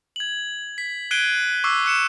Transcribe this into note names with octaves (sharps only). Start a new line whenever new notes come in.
G#6 F#7
B6
F#6 G#6 C7 D7 D#7 G7
C#6 D6 E6 C7
F#6 C#7 E7